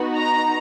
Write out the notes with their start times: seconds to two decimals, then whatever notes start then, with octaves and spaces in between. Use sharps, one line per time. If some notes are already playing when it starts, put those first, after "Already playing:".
Already playing: B3 D#4 F#4
0.15 A#5